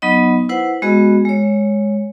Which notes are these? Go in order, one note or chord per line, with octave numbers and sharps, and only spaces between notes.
F#3 B3 D#4 D#5
E4 B4 C5 F#5
G#3 B3 F#4 G#4 D#5
G#3 C#5